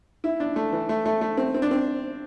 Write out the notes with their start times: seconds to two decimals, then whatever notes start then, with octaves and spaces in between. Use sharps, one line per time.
0.24 E4
0.40 D4
0.56 A3
0.72 E3
0.89 A3
1.06 A3
1.21 A3
1.37 C4
1.54 C4
1.62 D4
1.71 C4